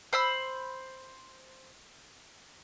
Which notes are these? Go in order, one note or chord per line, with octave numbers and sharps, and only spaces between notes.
C5 B5 E6